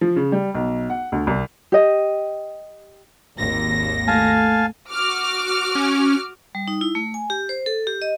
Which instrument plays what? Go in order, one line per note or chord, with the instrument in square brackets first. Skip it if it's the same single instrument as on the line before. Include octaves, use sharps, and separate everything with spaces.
[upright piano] F3
C#3
G3
B1
F#5
D2
C2
[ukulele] G4 D#5
[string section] G#1 D#2 A#6
[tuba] A3 [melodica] F5 G#5 A5
[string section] F#4 D6 F6
[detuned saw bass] C#4
[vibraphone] G3
D#4
E4
A3
G#5
G4
C5
A4
G4
D#5